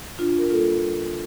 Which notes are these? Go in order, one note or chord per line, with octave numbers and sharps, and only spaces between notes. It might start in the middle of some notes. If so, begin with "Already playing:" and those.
A#2 D4 F4
A#4
G3 A#3 F4 A4
D3